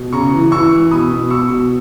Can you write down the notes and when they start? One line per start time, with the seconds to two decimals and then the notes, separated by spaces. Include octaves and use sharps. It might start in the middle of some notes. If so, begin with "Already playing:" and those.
Already playing: B2
0.12 C#3 A#5 C#6
0.32 E3
0.52 E3 C#6 E6
0.72 E3
0.91 B2 B5 D#6
1.11 B2
1.30 B2 C#6 E6
1.50 B2